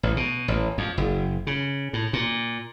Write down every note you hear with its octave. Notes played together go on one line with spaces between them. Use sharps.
A1
B2
A1
F2
F#1
C#3
A2
A#2